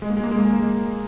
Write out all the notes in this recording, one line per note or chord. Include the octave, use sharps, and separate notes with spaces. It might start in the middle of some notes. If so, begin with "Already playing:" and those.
G#3
A#3
G#3
A#3
G#3
A#3
G#3
A#3
G#3